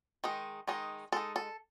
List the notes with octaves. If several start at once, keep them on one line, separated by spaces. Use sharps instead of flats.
D#3 G#3 D#4
D#3 G#3 D#4
G#3 D#4 A4
A4